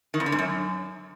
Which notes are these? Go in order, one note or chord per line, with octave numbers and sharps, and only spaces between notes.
D#3
F2
D3
G#2
F#2